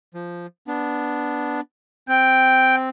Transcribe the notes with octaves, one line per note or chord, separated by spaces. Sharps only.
F3
B3 D4
C4 G5